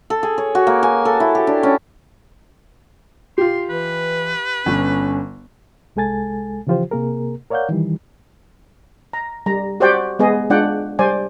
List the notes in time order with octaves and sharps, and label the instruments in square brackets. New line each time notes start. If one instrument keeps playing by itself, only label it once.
[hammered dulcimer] A4
G#4
C#5
F#4
A#3
G#5
A4
E4
G4
D4
C#4
[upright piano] F4 G4 [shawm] C6
[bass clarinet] E3 [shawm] B4
[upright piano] G1 [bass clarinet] C#4
[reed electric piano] C2 G#3 A4 G#5 A6
C#3 E3 F3 F4 G4 C5
C3 A#3 G#4 A#4
A#4 C#5 D5 F5 F#5 G6
D#3 E3 G3
[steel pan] A#5
G3 A#5
F#4 G4 C5 D5 F#5 G5
G#3 B3 G#4 D#5
G#3 D4 F4 D5 F#5 G5
G3 C5 D5 G#5